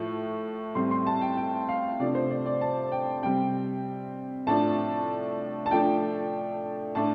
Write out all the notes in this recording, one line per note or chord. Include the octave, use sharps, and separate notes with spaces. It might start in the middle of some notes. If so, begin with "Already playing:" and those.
Already playing: A2 F3 A3
A2 G3 C4 C6
C6
A5
G5
G5
F5
C3 F3 A3 D4 D5
C5
D5
D5
A5
G5
C3 G3 C4 G5
A2 F3 D4 A5
A5
F3 A3 D4 G5
A2 A3 D4 A5